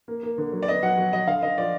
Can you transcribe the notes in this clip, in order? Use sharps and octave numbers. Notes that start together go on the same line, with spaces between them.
A#3
A#3
D3
F#3
D5
B3 D#5
F#3 F#5
F#3
F#3 D#5
D3 F5
D3 D#5
F3 D5